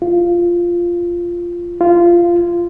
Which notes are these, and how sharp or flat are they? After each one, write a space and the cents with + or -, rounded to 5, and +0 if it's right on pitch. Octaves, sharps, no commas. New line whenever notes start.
F4 -5
F4 -15